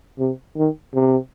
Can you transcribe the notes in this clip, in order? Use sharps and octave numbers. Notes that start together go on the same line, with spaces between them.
C3
D#3
C3